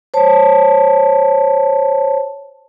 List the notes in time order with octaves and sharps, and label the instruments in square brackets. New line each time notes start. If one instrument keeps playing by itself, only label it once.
[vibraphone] C5 C#5 A5